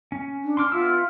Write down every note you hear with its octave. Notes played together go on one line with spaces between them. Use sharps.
C#4
D4
C6 D6 F6
B3 E4 F4 E6